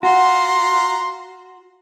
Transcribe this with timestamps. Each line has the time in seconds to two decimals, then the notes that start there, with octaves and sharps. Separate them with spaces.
0.03 F4 F#4 F#5 A#5 C6